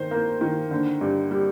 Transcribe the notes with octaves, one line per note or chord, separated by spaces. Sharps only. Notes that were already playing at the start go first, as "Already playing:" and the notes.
Already playing: D#3 C5
A#3
D#3
D3
G2
G3